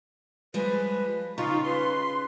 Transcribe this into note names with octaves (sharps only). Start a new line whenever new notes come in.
F3 G3 G#3 B4
C#3 D#4 F4 C#6
B4 C6